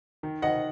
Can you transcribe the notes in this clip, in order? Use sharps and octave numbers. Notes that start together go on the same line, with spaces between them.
D#3
D#3 D#5 F#5